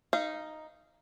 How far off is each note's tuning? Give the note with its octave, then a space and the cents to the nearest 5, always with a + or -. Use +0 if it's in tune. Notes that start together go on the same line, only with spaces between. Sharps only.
D#4 +0 F5 -25